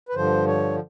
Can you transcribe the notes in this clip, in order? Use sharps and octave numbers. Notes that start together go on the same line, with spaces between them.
B4
G2 D3 F3 C5
C#5